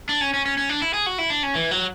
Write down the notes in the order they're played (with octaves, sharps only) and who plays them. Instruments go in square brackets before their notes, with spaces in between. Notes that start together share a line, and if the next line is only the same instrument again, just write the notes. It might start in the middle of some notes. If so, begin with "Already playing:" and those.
[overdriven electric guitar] D4
C#4
C#4
C#4
C#4
D4
E4
G#4
F#4
E4
D4
C#4
E3
F#3